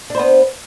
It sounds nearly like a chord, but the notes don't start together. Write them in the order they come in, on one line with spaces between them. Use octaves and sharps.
D4 C5 B3